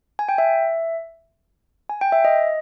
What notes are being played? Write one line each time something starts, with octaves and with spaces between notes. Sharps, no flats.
G#5
G5
E5
G#5
G5
E5
D#5